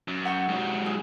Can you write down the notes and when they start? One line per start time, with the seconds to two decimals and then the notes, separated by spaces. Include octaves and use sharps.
0.08 F#2
0.25 F#5 G5 C#6
0.49 G#2 F#3
0.86 G#4